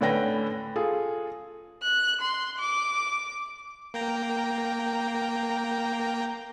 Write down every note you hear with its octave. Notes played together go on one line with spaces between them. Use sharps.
A2 D3 C#4 B4 G5 A#6
F4 G#4 A4
F#6
C6
D6
A#3 G5 A#5